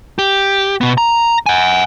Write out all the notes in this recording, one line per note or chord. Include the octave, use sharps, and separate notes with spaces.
G4
B2 B3
A#5
F#5 G#5